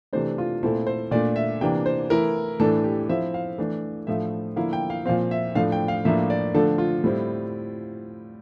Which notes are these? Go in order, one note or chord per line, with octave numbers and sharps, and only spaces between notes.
C3 E3 A3 D4 C5
F4
A#2 A3 C4 E4 A4
C5
A#2 A3 D4 D5
E5
C3 E3 A#3 D4 G5
C5
E3 A3 E4 A#4
A2 E3 A3 D4 A4
G4
F3 C4 E4 E5
F5
E3 A3 D4
A2 F3 A3 D4 E5
D3 F3 A#3 E4 F5
G5
F5
A#2 F3 C4 F5
E5
A2 F3 A3 D4 F5
G5
F5
A2 F3 A#3 D4 E5
D5
D3 F3 A3 D4 A4
F4
A2 G3 C4 E4